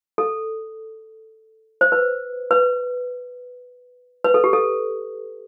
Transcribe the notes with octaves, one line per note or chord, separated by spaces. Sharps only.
A4
C5
B4
B4
B4
A4
G4
A4